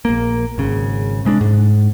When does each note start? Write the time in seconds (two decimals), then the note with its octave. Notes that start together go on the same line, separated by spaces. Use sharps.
0.05 A#1 A#3
0.58 G#1 C#3
1.25 C3 G#3 A#3 D4
1.41 G#2